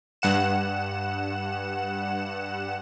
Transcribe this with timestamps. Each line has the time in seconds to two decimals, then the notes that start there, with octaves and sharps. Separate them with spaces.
0.22 G2 F#5 E7